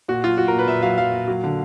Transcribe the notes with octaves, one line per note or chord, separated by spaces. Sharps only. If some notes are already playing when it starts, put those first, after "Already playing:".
A#2 F#4
F#3 F4
F#3 F#4
A#4
A#2
B4
A#2 E5
F#3 F5
F#3 F5
A#2
F#3
D3